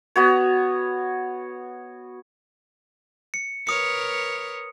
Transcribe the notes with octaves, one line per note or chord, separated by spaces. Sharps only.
B3 F#4 C#5
C#7
A#4 B4 C#5 D#6 C#7